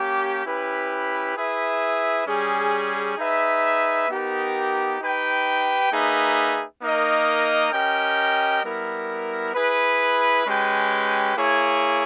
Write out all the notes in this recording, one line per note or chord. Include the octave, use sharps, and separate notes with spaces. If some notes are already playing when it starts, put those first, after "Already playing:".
Already playing: A#3 C#4 G4
C#4 E4 G4 B4
E4 G#4 B4 E5
G3 C#4 G#4
D#4 G#4 B4 E5
B3 D#4 G4 A#4
D#4 G4 B4 G5
A#3 D#4 G#4 B4 E5
A#3 D#4 A#4 D#5
C#4 G4 A#4 D#5 G5
G3 B3 E4 A#4
E4 G#4 B4
G#3 C#4 G4 B4 G5
A#3 E4 G#4 C#5